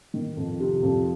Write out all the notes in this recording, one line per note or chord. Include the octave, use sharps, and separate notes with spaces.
D#3
F2
C3
F2